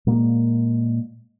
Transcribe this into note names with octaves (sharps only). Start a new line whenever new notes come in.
A#2 G#3 A#3